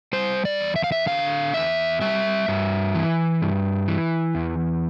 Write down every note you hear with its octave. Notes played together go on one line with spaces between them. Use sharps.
G3 C5
D5
E2
E5
F5
E5
D3 F5
E2 E5
G3 E5
G2
E3
G2
E3
E2